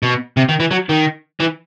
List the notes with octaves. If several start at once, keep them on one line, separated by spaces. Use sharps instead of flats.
B2
C3
D#3
E3
F#3
D#3
E3